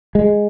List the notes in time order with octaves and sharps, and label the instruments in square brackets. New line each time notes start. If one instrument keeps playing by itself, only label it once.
[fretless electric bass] G#3